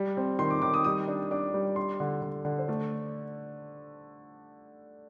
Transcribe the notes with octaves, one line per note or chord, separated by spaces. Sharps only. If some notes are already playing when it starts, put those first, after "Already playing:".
Already playing: G3
C4
D#3 C6
D6
D#3 D6
D#6
G3 D#6
D4
D4 D6
G3
D4 C6
D3
D3
D3
C5
A3 D5